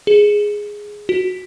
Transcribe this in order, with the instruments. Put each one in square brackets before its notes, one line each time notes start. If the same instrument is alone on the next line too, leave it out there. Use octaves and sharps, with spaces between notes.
[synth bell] G#4
F#4